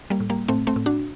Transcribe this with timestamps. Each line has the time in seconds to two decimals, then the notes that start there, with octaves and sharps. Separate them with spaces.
0.10 G3 A#3
0.20 A2
0.30 G3 A#3
0.48 A2 A3 C4
0.67 A3 C4
0.76 A2
0.86 D4 F#4